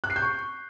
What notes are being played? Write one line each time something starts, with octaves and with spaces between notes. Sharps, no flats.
F#6
C7
G6
C#6